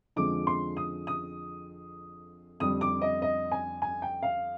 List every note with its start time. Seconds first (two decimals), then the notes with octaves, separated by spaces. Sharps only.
0.16 F2 D3 F3 G#3 D6
0.47 C6
0.77 D#6
1.07 D#6
2.60 F2 D3 G3 D#6
2.81 D6
3.02 D#5
3.22 D#5
3.52 G#5
3.82 G#5
4.02 G5
4.23 F5